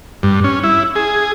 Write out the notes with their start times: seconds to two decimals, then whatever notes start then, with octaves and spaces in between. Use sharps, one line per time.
0.23 G2
0.44 C#4
0.64 E4
0.96 G#4